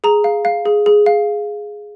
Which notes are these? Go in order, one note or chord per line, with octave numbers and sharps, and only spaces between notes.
G#4 A#5
F5
F5
G#4
G#4
F5